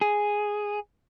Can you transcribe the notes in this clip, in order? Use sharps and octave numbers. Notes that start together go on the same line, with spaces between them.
G#4